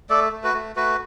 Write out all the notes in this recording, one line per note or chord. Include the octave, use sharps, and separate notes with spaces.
A3 A4 D5
A3
F#4 B4
A3
A3 F#4 B4